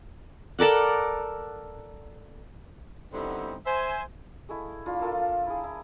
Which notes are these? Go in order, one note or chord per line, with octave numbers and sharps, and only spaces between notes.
A4 A#4 D5 F#5
D3 G3 B3 C4 D#4 E4
C5 E5 G#5
G#3 A3 E4
D4 E4 F4
F4 A4 A#4 F5
E4 G#4
E4